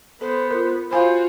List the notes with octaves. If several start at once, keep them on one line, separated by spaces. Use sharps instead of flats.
B3 A4 C5
F4 A#4
F4 F#4 C5 F5 G#5 B5